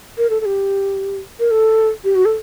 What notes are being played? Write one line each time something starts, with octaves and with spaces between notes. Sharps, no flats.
A#4
A4
A4
G4
A#4
A4
G4
F#4
A4